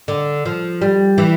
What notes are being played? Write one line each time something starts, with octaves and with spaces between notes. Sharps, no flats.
D3
F3
G3
E3